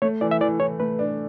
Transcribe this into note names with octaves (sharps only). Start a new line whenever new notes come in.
A3 C#5
E3 D5
E5
E3 D5
E3 C#5
A3 B4
D4